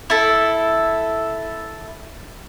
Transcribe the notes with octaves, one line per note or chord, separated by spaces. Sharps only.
E4 A4